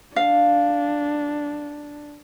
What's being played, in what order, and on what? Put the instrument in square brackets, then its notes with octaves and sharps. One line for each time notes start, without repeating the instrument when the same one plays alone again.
[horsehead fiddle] D4 [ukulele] F5